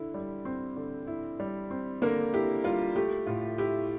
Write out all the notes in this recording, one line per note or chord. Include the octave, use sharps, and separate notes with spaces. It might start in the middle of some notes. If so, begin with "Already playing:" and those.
Already playing: D3 E4
G3
C4
D3
E4
G3
C4
D3 A#3 A#4
E4 G4
G3 F4
A3 G4
A2 F4
E4 G4